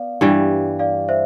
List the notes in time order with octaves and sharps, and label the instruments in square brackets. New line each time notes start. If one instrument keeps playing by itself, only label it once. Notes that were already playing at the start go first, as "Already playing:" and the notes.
Already playing: [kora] B3 [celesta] D5 F5
[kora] G2 E3 G3
[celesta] D5 F5
C5 E5